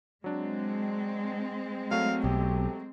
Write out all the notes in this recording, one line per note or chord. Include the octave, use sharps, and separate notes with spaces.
F#3 G#3 C4 D4
F#3 A3 F5
B1 G4